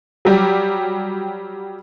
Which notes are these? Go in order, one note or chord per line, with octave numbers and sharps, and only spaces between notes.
F#3 G3 G4